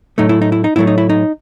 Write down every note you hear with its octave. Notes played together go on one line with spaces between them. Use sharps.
A2 F#3 A3 D#4
E4
D#4
E4
D#4
A2 F#3 A3 E4
D#4
E4
D#4